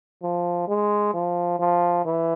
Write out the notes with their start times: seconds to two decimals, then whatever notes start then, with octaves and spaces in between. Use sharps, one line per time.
0.22 F3
0.68 G#3
1.14 F3
1.59 F3
2.05 E3